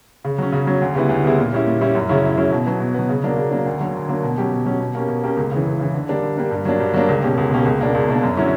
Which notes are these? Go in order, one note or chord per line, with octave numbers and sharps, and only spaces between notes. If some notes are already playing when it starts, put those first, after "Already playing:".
C#3
F#3 C#4
C#3
F#3 C#4
D2
C#3 G3 B3 E4
D2
C#3 G3 B3 E4
A#2
G3 C#4 E4
A#2
G3 C#4 E4
F#2
C#3 F#3 C#4 E4
F#2
C#3 F#3 C#4 E4
B2
F#3 B3
B2
F#3 B3
C#3
F#3 A#3 D4
C#3
F#3 A#3 D4
D2
D3 F#3 A#3
D2
D3 F#3 A#3
B2
F#3 C#4 G4
B2
F#3 C#4 G4
B2
A#3 C#4 G4
B2
A#3 C#4 G4
C#2
C#3 E3
C#2
C#3 E3
D3
G3 A#3 D4
D3
G3 A#3 D4
G2
F#3 A#3 D4
G2
F#3 A#3 D4
C#2
B2 A#3 C#4 G4
C#2
B2 A#3 C#4 G4
C#2
B2 A#3 D4
C#2
B2 A#3 D4
F#2
D3 F#3 C#4 E4